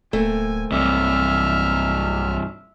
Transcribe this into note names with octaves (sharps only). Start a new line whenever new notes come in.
D1 A3 A#3 C4 G#5
B1 G2 C3 E5 F6